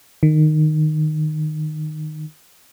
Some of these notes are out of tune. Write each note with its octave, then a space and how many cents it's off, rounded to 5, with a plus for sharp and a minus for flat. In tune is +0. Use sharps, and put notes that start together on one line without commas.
D#3 -15